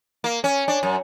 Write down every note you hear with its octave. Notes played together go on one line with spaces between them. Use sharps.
A#3
C#4
D4
F#2